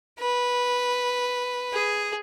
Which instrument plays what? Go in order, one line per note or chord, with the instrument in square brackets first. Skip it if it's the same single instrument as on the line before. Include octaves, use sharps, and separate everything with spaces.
[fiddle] B4
G#4